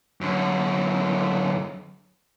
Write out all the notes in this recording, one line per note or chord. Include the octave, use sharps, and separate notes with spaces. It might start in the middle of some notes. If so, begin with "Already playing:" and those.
F#2 D3